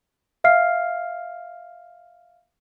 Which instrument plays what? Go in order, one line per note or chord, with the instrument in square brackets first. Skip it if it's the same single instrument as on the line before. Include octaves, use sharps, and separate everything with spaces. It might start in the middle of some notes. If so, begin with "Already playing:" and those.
[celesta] E5 F5 F6 C7